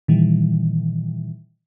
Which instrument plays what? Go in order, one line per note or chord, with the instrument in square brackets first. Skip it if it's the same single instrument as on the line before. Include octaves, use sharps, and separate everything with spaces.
[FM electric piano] A#2 D#3 E3 G3